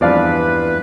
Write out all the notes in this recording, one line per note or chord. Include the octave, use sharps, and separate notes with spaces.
E2 G2 F3 B4 D5 F5